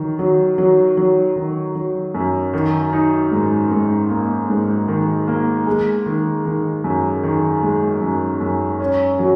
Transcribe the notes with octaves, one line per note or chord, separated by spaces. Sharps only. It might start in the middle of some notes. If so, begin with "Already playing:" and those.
Already playing: D#3 F#3
F#3
F#3
F#3
D#3
F#3
F#2
D#3
D#4
G#2
G#2
A#3
G#2
D#3
A#3
G#3
D#3
D#3
F#2
D#3
G#3
F#2
F#2
C#4
F#3